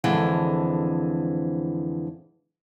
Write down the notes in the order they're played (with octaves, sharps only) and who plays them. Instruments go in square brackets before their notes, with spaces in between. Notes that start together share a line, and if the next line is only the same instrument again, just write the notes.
[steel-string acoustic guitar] F2 D3 E3 G#3